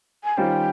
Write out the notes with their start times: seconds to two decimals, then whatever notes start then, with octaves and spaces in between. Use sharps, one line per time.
0.24 G#5
0.37 D#3 G3 C#4 F4 C5 G5